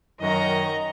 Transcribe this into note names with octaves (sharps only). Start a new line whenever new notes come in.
F#2 D#3 D#5 A#5 C#6